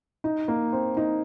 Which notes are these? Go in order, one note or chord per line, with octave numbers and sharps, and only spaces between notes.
D#4
A#3
C4
D#4